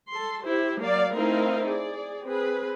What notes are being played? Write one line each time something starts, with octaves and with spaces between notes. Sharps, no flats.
A4 C6
E4 G4 C5
F#3 A#3 D5 F5
A3 C4 D#4 E4 A#4 F5
G#4 D5
C4 G#4 B4